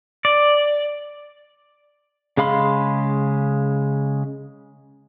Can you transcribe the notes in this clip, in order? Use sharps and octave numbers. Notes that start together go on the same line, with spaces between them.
D5
C#3 G#3 F5 B5 C6